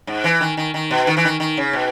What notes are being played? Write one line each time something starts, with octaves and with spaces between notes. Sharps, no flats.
G#2
E3
D#3
D#3
D#3
B2
D#3
E3
D#3
D#3
C#3
B2